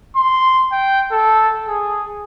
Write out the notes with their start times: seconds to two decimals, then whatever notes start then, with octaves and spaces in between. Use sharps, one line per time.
0.16 C6
0.72 G5
1.12 A4
1.68 G#4